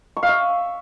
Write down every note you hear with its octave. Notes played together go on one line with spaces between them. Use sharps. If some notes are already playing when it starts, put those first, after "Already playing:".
C#6
F5
E5